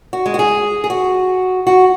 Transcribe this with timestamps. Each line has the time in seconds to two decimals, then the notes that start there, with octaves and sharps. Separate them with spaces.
0.13 F#4
0.26 G#3
0.34 F#4
0.39 G#4
0.84 G#4
0.90 F#4
1.67 F#4